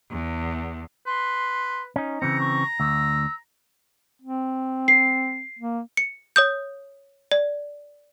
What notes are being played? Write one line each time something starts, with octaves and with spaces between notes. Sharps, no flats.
E2
B4 C6
C#4 D#4
C#3 E3 C4 A#5 C#7
C#6
D2 E6
C4
C7
A#3
C#7
C#5 D#6 G6
D5